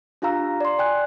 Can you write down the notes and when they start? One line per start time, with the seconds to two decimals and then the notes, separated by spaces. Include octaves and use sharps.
0.22 D4 F4 G4 F5 A#5 E6
0.61 D5 C6
0.79 D5 G5 G#5 F#6